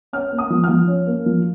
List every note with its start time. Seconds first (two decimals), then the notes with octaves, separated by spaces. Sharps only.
0.13 C#4 F6
0.32 A#3
0.38 D#6
0.50 F3
0.64 F6
0.69 F3
0.88 C#4
1.07 A#3
1.26 F3